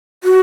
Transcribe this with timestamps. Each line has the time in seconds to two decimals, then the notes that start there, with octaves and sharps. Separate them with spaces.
0.24 F#4